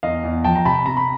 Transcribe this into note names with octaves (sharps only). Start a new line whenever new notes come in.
E2 D#5 F5
E2
F3 G5 A5
A#5
C3 A5 B5
C3 A#5
B5